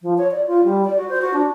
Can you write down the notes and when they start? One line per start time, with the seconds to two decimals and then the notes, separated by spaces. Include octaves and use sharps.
0.02 F3
0.18 C#5
0.31 D5
0.47 F4
0.64 G3
0.84 D5
0.97 F#4
1.09 C5
1.21 F#4
1.33 D4